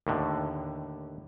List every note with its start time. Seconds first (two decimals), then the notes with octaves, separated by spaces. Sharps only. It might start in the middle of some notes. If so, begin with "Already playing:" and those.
0.07 D#2 A2 D3